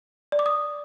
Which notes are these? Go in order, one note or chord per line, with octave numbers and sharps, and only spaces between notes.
D5
D6
D#6